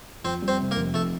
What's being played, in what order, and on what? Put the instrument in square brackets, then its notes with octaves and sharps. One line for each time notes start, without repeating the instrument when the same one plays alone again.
[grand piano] F2 [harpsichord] C4 C5
[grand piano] G3
[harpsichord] C4 C5
[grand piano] C3
[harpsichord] A#3 A#4
[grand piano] F1
[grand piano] F2 [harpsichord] A3 A4